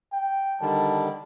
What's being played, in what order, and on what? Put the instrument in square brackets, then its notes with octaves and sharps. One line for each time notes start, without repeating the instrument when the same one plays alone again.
[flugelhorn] G5
[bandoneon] D3 D#3 G3 [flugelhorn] A5